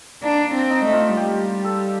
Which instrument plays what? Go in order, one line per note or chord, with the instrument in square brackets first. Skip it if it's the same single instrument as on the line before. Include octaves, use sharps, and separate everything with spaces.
[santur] A#3 [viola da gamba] D4
[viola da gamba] C4
[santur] D#4
[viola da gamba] A3
[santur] F4
[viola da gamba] G3 [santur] G4
[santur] A4